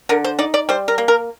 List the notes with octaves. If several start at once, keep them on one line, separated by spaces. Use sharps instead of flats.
D3 A#4
C5
D#4 D5
D5
G3 C5
A#4
A#3
A#4